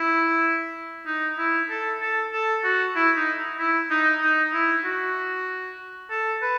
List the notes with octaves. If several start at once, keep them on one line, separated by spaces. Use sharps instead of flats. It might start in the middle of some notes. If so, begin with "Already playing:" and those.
Already playing: E4
D#4
E4
A4
A4
A4
F#4
E4
D#4
E4
D#4
D#4
E4
F#4
A4
B4